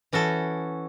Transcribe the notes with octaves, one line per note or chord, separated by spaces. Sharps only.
E3 C#4 F#4 A4